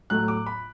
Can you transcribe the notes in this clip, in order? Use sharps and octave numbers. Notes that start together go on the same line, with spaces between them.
A2 F#3 A3 F#6
D6
B5